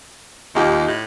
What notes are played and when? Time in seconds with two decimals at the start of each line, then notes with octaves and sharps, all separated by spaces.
0.55 D#2 D#4 F4 G4
0.87 A2